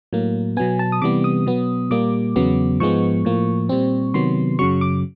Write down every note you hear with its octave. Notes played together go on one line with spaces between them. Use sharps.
A2 F#3 A#3
B2 F#3 B3 G#5
A5
D#6
C3 E3 G3 B3 D6
D#6
B2 F#3 B3
A#2 G3 A#3 D6
E2 C#3 F#3 B3
G#2 F3 G#3 B3 C#6
A2 F3 A#3
A#2 G3 C4
C3 D#3 F#3 B3 C6
F#2 C#3 F#3 C#6
D6